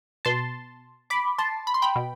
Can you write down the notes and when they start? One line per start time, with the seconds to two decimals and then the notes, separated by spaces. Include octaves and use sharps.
0.25 B2 A5 C6
1.10 B5 D6
1.38 A5 C6
1.67 B5
1.74 C6
1.82 G5 B5
1.96 B2